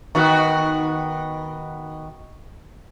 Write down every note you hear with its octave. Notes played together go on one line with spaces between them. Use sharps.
D#3 B3 F#4